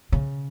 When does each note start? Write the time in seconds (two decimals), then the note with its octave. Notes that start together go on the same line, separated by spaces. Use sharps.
0.12 C#3